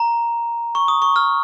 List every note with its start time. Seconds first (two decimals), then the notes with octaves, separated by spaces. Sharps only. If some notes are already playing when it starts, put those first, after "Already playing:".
Already playing: A#5
0.75 C#6
0.88 D#6
1.02 C#6
1.16 F6